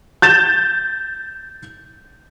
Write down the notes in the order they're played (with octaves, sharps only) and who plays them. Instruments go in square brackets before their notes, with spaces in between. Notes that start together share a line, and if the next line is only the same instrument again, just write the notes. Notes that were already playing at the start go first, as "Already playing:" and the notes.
[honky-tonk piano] G6 A6 E7